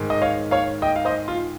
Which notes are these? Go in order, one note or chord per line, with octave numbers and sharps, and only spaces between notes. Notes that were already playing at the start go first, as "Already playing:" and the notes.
Already playing: G#2 D#3
D#5
C#5 F5
C#5 F5
D#5 G5
F5
C5 D#5
F4